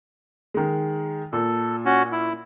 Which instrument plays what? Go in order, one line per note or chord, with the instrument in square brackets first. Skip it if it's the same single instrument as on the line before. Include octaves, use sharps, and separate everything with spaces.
[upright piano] D#3 G#3
[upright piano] A#2 [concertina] A4
[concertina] C#4 F#4
E4